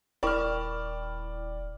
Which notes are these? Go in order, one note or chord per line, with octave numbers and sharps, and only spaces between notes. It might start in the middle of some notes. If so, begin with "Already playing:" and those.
D#1 E4 D5 G5 B5 F6